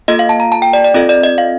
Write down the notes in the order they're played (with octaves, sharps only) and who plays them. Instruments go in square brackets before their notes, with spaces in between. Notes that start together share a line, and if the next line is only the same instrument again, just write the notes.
[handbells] A#3 F4 A4 D#5
F5
A5
A#5
A5
G5
D5
D5
C4 F4 A4 D#5
D5
D#5
F5